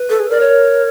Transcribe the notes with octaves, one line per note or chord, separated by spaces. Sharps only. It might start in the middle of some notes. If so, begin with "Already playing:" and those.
Already playing: B4
A4
G#4
A#4 D5
C#5